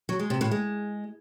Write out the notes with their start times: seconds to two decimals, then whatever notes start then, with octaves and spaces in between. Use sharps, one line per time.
0.09 F#3
0.20 G#3
0.30 C3
0.41 A2
0.51 G#3